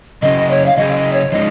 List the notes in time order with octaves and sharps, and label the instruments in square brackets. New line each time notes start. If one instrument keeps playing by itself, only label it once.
[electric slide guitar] C#3 F#3 C#4 G#4 [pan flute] D#5
[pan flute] C#5
F5
[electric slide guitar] C#3 F#3 C#4 G#4 [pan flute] D#5
[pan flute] D#5
C#5
[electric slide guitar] F3 G#3 D#4 [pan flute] D#5